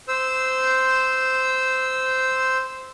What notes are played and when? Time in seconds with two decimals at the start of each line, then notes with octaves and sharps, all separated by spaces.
0.08 C5 E6